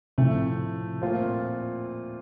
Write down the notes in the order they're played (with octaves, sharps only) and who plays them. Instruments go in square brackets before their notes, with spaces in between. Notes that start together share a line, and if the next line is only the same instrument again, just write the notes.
[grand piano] A2 F3 A3 [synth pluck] C3
[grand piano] A#2 A3 C4 F4